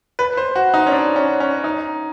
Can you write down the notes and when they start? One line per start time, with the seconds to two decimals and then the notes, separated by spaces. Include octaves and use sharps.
0.19 B4
0.37 C5
0.56 F#4
0.74 D#4
0.87 C#4
0.92 D4
1.16 C#4
1.40 C#4
1.64 D#4